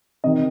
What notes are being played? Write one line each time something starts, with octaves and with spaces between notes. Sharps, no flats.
C3 D#3 D#5